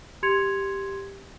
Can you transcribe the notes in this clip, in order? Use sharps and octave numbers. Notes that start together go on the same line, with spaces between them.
G4 C6 G#6 C#7 F7